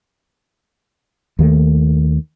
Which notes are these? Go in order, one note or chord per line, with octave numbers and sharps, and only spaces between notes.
D#2 D#3 F3 A3